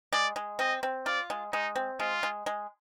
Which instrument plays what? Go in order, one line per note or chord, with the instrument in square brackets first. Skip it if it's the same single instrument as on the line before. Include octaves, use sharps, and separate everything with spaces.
[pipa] G#3 [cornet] D5
[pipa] G#3
[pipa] C4 [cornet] D#5
[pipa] C4
[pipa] F4 [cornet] D5
[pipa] G#3
[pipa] G#3 [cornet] D#4
[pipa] C4
[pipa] G#3 [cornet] F4
[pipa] G#3
G#3